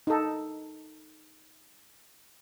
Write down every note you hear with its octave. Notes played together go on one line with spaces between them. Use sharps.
D#4 A4